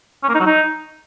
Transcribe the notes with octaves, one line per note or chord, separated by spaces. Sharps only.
C#4
A#3
D#4
F#3
D#4